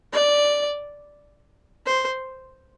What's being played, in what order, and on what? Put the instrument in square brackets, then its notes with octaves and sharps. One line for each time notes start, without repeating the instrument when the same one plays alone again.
[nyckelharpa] D5
C5